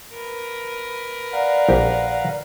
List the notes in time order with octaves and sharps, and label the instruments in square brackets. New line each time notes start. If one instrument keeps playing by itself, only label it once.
[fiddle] A#4 B4
[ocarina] D5 [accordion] F5 F#5 A#5
[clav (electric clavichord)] A#1 G4